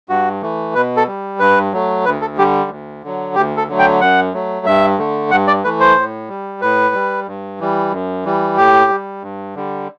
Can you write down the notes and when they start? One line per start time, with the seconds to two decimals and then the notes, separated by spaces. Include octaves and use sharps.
0.09 G2 F#4
0.42 E3 A3
0.75 B2 B4
0.97 A4
1.07 G3
1.39 G2 B4
1.73 F#3 A3
2.05 D2 B4
2.21 A4
2.37 D3 G3 G4
2.70 D2
3.03 D3 F#3
3.35 D2 G4
3.57 A4
3.68 D3 F#3 A3
3.79 G5
4.01 F#2 F#5
4.34 F#3 A3
4.66 G2 E5
4.98 D3 A3
5.31 G2 F#5
5.47 D5
5.64 E3 A3 B4
5.80 C5
5.96 A2
6.29 G3
6.61 A2 B4
6.94 G3
7.27 G2
7.60 E3 G3
7.92 F#2
8.25 E3 G3
8.57 A2 G4
8.90 G3
9.22 G2
9.55 D3 G3